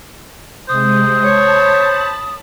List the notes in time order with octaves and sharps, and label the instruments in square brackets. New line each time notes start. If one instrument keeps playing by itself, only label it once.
[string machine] C3 G#3 [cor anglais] C5 [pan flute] D#6
[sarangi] C#5 [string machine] A5 B5